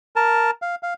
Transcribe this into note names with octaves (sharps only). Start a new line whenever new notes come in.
A#4 A5
F5
F5